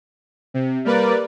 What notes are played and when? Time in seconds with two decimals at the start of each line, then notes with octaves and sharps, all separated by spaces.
0.54 C3
0.85 G3 A#3 A#4 B4 D5